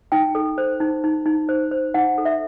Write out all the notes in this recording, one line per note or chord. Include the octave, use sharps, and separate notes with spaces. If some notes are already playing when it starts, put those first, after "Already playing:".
D#4 G5
A4
C5
D#4
D#4
D#4
C5
C5
D#4 F#5
A4
E5